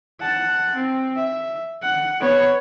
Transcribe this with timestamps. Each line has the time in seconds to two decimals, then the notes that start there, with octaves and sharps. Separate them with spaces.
0.20 F#5 A5
0.75 C4
1.16 E5
1.83 F#5
2.20 B3 C#5